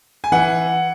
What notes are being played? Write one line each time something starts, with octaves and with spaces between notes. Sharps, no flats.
G#5
E3 F#5